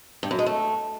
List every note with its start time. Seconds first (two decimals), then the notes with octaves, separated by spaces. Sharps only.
0.23 G2
0.31 F#2
0.39 G#3
0.46 A3